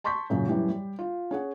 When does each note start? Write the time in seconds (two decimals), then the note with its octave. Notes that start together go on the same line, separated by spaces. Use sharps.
0.04 A5 C6 C#6 G6 B6
0.30 F#2 A#2 C#3
0.47 F#2 E3 G3
0.69 G3
0.99 F4
1.31 C#4 G#4 F#5